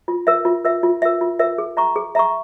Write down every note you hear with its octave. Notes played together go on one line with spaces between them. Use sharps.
F4
A#4 E5
F4
A#4 E5
F4
A#4 E5
F4
A#4 E5
G#4
E5 A#5 C#6
G#4
E5 A#5 C#6